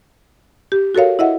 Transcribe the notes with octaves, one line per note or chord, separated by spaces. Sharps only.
G4
F#4 A4 A#4 C#5 F5
E4 D#5 E5 F#5